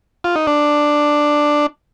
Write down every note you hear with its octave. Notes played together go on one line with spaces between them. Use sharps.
F4
D#4
D4